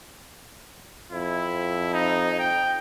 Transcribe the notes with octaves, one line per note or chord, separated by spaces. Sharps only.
F2 E4
D#4
G5